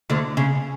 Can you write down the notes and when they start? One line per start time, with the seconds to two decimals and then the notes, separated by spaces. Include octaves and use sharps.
0.10 D2 D3
0.37 C#3